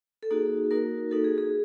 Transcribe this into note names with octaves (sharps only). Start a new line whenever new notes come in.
A4
A#3 D#4 F#4 G#4
A#3 D#4 F#4 A#4
A#3 D#4 F#4 A4
G#4
G#4